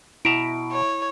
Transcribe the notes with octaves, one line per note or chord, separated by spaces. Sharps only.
B2 E4 E5 A#5 D7
C#5